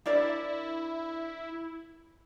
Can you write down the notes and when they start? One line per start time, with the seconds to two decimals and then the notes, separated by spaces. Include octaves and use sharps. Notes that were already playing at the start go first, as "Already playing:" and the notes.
0.06 D4 E4 A#4 D5